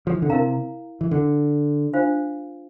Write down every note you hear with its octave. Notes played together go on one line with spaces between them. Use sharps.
F3
E3
D3
C3 E4 A#4 F5 A#5
E3
D3
D4 F4 C5 F5